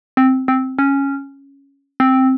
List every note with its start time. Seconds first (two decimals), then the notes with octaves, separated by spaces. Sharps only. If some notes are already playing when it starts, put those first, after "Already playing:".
0.17 C4
0.48 C4
0.79 C#4
2.00 C4